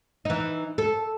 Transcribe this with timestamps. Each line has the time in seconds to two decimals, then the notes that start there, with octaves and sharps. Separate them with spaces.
0.25 E3 D#4
0.78 A4